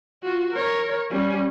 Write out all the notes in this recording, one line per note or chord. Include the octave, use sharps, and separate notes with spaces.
F4 F#4
A#4 C#5
G3 C#4